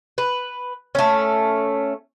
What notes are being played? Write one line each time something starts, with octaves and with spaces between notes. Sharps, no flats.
B4
A3 C#4